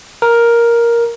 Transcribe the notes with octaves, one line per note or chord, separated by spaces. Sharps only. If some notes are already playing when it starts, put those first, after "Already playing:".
A#4